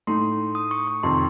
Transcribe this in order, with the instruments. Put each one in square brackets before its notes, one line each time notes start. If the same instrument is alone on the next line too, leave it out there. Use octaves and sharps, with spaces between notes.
[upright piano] A2 A3 D#4 [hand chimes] C6
[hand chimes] D#6
C#6
C#6
[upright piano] F2 C3 D#3 [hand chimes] C6